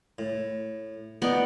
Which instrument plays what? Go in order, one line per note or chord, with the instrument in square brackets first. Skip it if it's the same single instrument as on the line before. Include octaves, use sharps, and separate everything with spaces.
[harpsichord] A2
[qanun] B3 D5 [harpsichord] D#4